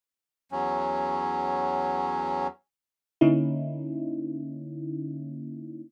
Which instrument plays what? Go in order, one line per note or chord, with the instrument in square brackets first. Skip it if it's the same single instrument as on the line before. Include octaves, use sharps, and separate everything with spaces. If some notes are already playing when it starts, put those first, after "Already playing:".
[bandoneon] E2 F#3 C#4
[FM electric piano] D3 A#3 C#4 D#4 E4